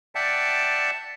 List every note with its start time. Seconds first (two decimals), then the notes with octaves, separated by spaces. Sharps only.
0.15 D5 E5 F#5 G5 A5